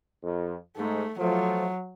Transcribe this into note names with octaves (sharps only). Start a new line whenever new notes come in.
F2
G#2 A3
F3 F#3 A3